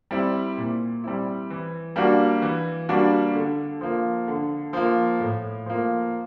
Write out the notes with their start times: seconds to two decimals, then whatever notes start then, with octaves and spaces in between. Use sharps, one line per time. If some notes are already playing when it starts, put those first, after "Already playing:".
0.11 G3 C4 E4
0.58 A#2
1.04 G3 C4 E4
1.50 E3
1.96 G3 A#3 D4 F#4
2.42 E3
2.89 G3 A#3 D4 F#4
3.34 D3
3.81 F3 A#3
4.28 D3
4.73 F3 A#3
5.20 A2
5.66 F3 A#3